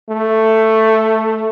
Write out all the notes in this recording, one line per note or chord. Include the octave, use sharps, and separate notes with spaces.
A3